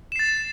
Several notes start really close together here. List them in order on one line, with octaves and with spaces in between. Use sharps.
E7 C7 A6